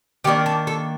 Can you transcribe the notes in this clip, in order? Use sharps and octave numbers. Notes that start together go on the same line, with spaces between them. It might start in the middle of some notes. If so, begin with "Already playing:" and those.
D#3 A#3 D4 G4
A4
A4